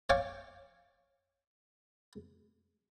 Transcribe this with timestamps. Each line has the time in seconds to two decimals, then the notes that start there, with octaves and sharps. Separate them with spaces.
0.10 C#5 D5 F5 G5 C#6 D6